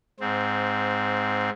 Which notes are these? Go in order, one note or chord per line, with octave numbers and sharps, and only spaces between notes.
G#2 C4